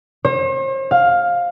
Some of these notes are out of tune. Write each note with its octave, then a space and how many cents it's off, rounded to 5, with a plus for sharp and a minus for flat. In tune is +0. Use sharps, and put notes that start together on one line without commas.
C5 +45
F5 +10